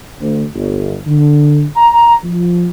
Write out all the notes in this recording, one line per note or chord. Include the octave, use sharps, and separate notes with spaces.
D2
G1
D3
A#5
F3